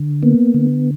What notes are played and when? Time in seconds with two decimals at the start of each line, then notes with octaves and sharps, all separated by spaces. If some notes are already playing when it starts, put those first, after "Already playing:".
Already playing: D3
0.23 A#3 B3
0.54 D3